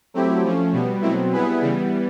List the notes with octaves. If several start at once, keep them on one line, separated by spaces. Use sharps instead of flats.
F#3 A3 C4 E4 G4
F3 A3 C#4
B2 G3 B3
B2 F#3 A3 C4 E4
G3 B3 E4 G#4 B4
C#3 E3 G3 B3